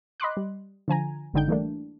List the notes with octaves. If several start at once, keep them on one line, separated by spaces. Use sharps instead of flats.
D#5 B5 C6 D6 F#6
G3
D3 F3 G#5 A#5
G1 G#2 D3 D#4 G5 G6
E3 G3 A3 A#3 D4